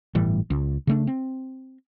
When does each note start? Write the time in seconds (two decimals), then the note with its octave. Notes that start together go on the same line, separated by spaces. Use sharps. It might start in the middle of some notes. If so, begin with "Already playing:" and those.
0.15 G1 A2 E3 G3
0.50 C#2
0.87 C#3 A3 D4
1.07 C4